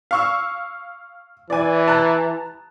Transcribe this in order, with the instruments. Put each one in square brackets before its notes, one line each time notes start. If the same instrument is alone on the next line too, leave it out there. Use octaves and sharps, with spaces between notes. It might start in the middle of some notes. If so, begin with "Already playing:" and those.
[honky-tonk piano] F5 C#6 E6
[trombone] E3 [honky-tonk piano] D5 G#5
[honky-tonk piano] A5 A#5 F#6